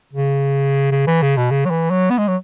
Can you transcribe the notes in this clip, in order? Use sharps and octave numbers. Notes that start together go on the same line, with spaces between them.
C#3
C#3
E3
C#3
B2
C#3
F#3
E3
F#3
B3
G#3
F#3